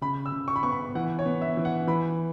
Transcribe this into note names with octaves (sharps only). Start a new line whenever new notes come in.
C#3 B5
E6
C#3
C#6
B5
B3 C#6
B5
E3 F#5
C#5
B3
E5
E3
F#5
E3 B5